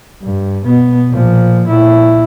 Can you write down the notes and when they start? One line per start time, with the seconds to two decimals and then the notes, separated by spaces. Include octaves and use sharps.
0.22 G2
0.66 B2 B3
1.10 A#2 F3
1.67 A#2 E4